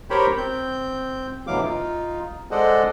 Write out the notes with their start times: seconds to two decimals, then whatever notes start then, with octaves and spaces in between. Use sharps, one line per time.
0.10 G4 A#4 C5 C#5 G5 B5
0.37 C4 G6
1.47 D2 B2 E3 F#3 F5 D6
1.64 D#4 F4
2.51 G#3 A4 C5 D5 D#5 F#5